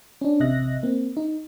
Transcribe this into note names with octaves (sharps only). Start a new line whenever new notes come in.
C#4 D4
A1 C3 D#5 E5 F#6 A#6
A#3 C4
D#4